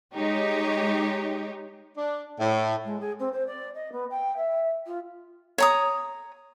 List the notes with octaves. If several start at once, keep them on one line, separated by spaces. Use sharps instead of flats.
G#3 D#4 G4 C#5
D4
A2
G#3
G#4
C4
C5
D5
D#5
B3
G5
E5
F4
C#5 A#5 D#6